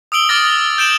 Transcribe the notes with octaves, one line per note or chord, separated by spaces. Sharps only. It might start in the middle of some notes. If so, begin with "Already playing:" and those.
D#6 E6 D7 F#7 G7
D6 D#6 F6 A6 A#6
G6 D7 E7 F#7